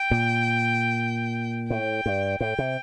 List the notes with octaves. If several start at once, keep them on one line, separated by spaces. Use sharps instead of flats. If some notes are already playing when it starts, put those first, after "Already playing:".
Already playing: G5
A#2
A2 G5
G2
A2 G5
C3